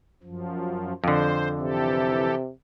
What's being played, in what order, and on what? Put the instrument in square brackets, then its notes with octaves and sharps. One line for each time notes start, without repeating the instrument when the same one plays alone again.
[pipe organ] F#2 F3
[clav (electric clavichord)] F2 D3 [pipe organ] C5
[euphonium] C3 [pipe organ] E3 G4 A4